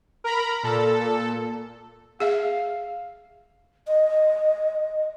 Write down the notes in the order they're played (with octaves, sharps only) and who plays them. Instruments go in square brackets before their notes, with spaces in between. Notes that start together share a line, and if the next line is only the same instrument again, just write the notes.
[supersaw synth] A#4 A#5 B5
A#2 A4
[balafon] G#4 E5 [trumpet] F5
[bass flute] D#5